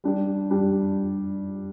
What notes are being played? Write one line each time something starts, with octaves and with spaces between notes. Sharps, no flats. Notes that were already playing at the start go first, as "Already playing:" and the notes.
G3 D4 G4
G3 D4 G4